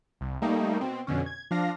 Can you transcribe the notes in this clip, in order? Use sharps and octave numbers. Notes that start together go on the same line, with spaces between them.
C2
G3 A3 A#3 D#4
B2 C4
F2 B2 D3 C#4
G#6
F3 D4 F5 A#6